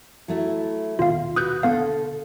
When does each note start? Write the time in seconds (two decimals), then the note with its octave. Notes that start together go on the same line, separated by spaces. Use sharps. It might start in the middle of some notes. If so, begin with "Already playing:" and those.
0.28 F#3 A3 E4
0.99 D#1 B2 D#3 F4 F5
1.36 F#4 B4 D#6 F#6 G6
1.63 D3 B3 A4 F5